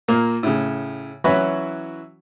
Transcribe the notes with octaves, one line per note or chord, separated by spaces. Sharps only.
A#2 A#3
A2 C#3
E3 F#3 C#4 E4 F#4 B4